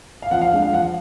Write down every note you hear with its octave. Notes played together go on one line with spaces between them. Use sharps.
F5
F3 F#5
F5
G#3 D4
F5
F3 F#5